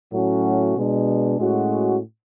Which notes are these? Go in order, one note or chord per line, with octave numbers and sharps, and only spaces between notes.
A2 F#3 A3 C#4 F#4
B2 G#3 D4
A2 G#3 C#4 F#4